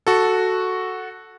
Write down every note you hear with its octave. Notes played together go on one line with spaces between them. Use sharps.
F#4 A4